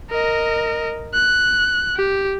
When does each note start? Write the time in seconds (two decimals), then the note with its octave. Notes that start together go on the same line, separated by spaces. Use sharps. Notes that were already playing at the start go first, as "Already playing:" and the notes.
0.10 A#4 D#5
1.14 F#6
1.97 G4